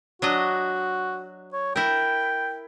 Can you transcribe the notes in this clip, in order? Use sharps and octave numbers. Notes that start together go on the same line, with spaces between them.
F#3 D4 F#4 D#5
C#5
E4 A#4 G5